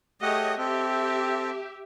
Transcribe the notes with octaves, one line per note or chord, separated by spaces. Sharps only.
A3 G4 G#4 C#5 D#5 F#5
C4 G4 A4 E5